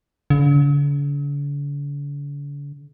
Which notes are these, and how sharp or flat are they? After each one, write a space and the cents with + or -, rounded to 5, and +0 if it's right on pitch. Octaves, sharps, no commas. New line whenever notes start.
D3 -45